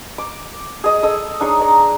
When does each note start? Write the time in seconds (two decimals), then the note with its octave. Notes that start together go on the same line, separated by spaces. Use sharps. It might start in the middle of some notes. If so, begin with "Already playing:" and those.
0.18 D6
0.84 G#4 D#5
1.03 A4 D#5 E6
1.40 D4 D#4 G#4 C#5
1.61 D5 A#5